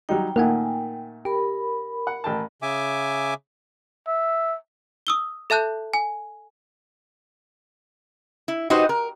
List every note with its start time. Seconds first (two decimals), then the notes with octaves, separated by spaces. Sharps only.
0.09 F#3 G3 D#4 G5
0.36 A#2 D#3 A3 A#3 A#4 F#5 G#5
1.25 G4 A#4 B5
2.07 F#5
2.24 A1 G5 A5
2.62 C#3 E5 G#5 D6
4.07 E5
5.07 D#6 E6 G7
5.50 A4 E5 A5 F#6 G6
5.94 G#5
8.48 E4
8.70 D#4 F#4 G4 B4 C5 D#5
8.89 A#4